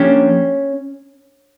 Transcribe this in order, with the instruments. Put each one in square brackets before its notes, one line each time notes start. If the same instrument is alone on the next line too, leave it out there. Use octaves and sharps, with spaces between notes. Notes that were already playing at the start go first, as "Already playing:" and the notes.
Already playing: [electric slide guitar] F3 A#3 D4 G4 [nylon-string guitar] C#4